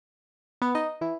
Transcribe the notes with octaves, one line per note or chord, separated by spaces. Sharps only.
B3 B4
D#4 D#5
E3 E4